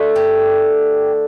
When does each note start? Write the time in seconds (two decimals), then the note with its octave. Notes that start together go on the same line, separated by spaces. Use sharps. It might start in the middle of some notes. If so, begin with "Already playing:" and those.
Already playing: D3 A3
0.16 G4